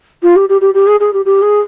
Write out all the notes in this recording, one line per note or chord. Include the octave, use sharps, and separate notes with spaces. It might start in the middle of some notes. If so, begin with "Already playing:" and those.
F4
G4
G4
G4
G4
G#4
G#4
G4
G4
G#4